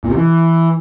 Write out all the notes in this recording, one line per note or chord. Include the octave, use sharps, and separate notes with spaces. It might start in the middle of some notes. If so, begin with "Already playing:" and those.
A#2
C3
E3